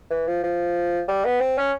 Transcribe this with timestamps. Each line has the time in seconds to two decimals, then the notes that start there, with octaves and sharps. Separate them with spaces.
0.10 E3
0.27 F3
0.43 F3
1.08 G3
1.25 B3
1.40 C4
1.58 C#4